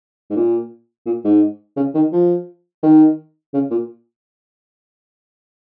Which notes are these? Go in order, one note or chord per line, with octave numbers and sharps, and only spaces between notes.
G#2
A#2
A#2
G#2
C#3
D#3
F3
D#3
C#3
A#2